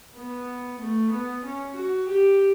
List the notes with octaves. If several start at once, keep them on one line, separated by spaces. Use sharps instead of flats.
B3
A3
B3
C#4
F#4
G4